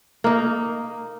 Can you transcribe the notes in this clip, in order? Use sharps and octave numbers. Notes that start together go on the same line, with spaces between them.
A#3 D#4